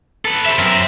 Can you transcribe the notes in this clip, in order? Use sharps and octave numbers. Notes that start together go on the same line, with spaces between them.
A4 B4
C5 E5
F#2 A#4